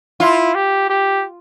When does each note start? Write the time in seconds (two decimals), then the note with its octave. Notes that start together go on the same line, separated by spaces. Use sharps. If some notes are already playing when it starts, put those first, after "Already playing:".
0.20 E4 F4
0.55 G4
0.89 G4